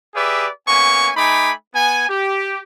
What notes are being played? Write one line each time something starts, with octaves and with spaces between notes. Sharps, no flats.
G4 G#4 B4 D5 E5
A#3 B3 C#4 G#5 C#6
A3 D#4 G#5 B5 D6
B3 G#5
G4